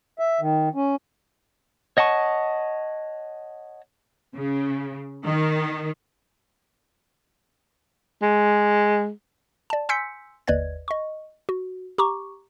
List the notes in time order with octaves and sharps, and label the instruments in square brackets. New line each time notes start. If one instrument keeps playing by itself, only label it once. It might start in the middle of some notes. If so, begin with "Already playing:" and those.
[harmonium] E5
D#3
C#4
[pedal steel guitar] C#5 D#5 F#5 A5 C#6
[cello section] C#3
D#3
[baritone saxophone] G#3
[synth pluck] D5 A5
G#5 C6 E6 G6 B6 C#7
G1 D#2 B4 D5 D#5 G#6
D#5 C#6
F#4
G4 A#5 C#6 D6